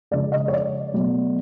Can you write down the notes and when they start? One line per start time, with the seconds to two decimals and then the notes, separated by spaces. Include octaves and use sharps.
0.11 C#3 F3 G#3 D5
0.32 D#5
0.48 C#5
0.53 D5
0.94 B2 F#3 A3